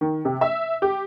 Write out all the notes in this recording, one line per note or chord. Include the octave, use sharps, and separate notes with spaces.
D#3
C3
E5
G4